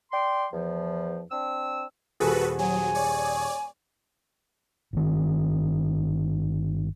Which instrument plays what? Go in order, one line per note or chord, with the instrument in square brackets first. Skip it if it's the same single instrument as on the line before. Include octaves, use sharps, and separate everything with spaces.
[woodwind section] D5 G5 C6
E2 F3
C4 D4 E6
[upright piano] D#1 G#4 [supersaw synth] F#4 A4 B4
[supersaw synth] F#3 [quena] G#5
[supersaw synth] C#5 D5
[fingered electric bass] G1 D#3